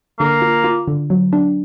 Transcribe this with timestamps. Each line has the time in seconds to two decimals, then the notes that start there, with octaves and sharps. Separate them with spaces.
0.19 D3 A#3
0.42 F4
0.64 F4
0.88 D3
1.10 F#3
1.33 D4